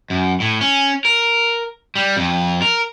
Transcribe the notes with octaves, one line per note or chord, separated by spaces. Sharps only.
F#2
A2
C#4
A#4
G3
F2
A#4